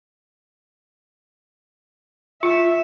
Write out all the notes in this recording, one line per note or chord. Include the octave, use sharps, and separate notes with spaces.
F4 E5